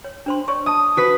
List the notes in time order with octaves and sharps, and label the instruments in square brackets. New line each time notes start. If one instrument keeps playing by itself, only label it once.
[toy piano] C#5
D4 C5 C6
C#5 D5 C#6
[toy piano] D#5 A5 [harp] D#6
[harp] F#4 B4 B6